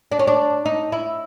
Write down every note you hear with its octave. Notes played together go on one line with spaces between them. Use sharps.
D4
C#4
D4
D#4
E4